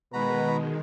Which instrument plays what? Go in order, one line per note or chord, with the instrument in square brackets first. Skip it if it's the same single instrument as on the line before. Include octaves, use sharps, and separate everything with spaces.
[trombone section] B2 [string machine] D#3 G#3 [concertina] F#4 A#5 B5 [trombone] B4